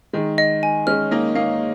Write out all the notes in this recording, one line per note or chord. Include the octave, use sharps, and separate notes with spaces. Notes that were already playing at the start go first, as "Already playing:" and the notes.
D#3 G#3 D#5
D#5
G#5
G#3 C#4 F6
A#3 D#4 A#4
A#3 D#4 F5